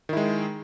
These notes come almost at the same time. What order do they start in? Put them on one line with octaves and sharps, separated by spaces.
D#3 E4 G#3